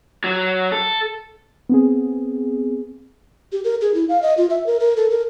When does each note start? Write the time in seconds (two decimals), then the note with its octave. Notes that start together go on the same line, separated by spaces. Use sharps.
0.24 F#3
0.72 A4
1.69 B3 C4 G#4
3.52 G4
3.64 A#4
3.81 G#4
3.94 E4
4.09 F5
4.22 D#5
4.38 F4
4.50 E5
4.66 A#4
4.80 A#4
4.97 A4
5.10 A#4